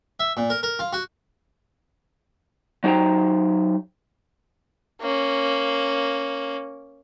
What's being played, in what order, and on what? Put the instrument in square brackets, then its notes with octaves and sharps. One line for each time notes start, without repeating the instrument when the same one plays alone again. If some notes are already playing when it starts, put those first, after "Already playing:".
[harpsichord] E5
A#2
A#4
A#4
F4
F#4
[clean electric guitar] F#3 D#4 C5 G5 A#5
[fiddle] A#3 C#4